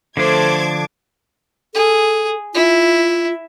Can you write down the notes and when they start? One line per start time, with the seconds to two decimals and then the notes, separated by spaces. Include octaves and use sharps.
0.17 D3 F3 A3 D4 C5 A5 D6 G#6
1.74 G#4 A4
2.54 E4 F4